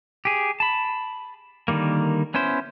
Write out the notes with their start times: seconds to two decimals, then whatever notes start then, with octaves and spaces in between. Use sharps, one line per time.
0.25 G4 G#4
0.60 A5 B5
1.68 D3 D#3 G3 A#3
2.34 B3 C#4 E4 C5